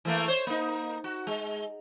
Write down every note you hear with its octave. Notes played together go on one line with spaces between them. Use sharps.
E3 A3 A#3
C5 C#5
A#3 D#4
F#4
G#3